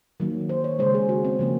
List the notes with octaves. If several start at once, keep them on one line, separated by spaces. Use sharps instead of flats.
D#3 F#3 A#3
C5
C#5
C#3 G#3 C5
G#4
F#4
C4
C#3 F3 A#3